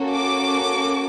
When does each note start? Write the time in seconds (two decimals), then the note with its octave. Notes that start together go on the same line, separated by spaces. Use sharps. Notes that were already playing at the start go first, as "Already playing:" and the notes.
Already playing: A#3 C#4 F#4 A4
0.10 D6